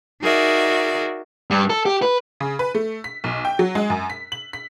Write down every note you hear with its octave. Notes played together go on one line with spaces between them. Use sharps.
D#4 F#4 G#4 A#4 D5 E5
G2
A4
G4
B4
C#3
B4
A3
B6
B1
G5
F#3
G#3
F#2
B6
F#7
B6